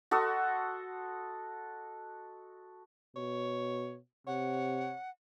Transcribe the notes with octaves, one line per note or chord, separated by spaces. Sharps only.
F#4 A4 D#5 C6
B2 C#5
C3 C#5 F#5